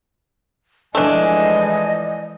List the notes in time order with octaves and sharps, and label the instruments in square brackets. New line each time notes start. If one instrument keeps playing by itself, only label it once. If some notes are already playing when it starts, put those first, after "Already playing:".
[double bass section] E3 F3 G#3 [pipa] A3 D4 [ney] D#5 [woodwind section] G#5